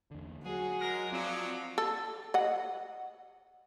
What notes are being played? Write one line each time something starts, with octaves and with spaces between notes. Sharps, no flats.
E2 D3
F#3 F#4 G#4
G#3 A#4 A#6
F3 F#3 C4 F4 D5
A4
D#5 F#5